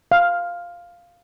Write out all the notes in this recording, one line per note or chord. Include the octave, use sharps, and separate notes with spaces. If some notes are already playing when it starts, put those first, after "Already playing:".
F5